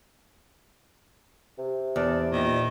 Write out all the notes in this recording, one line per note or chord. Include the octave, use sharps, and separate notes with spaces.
C3
E2 D4
A#2 D#3